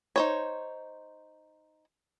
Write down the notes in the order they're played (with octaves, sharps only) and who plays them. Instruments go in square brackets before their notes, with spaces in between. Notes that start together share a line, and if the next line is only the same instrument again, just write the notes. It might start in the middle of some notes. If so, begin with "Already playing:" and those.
[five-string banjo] D#4 C5 C#5